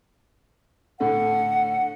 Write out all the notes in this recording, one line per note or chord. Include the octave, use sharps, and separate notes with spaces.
A2 D3 A3 F#5